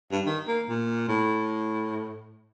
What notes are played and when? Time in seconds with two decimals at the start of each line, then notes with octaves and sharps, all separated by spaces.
0.11 G2
0.26 D#3
0.48 A#3
0.69 A#2
1.08 A2